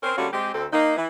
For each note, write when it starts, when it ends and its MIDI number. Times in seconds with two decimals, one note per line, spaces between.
0.03 0.14 60
0.03 0.14 61
0.03 0.14 70
0.18 0.27 50
0.18 0.27 55
0.18 0.27 57
0.18 0.27 58
0.18 0.27 61
0.18 0.27 66
0.33 0.51 56
0.33 0.51 60
0.33 0.51 67
0.54 0.66 38
0.54 0.66 60
0.54 0.66 69
0.73 0.96 58
0.73 0.96 63
0.96 1.07 52